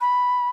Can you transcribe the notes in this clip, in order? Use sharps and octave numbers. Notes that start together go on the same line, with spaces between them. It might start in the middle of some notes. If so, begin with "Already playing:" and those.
B5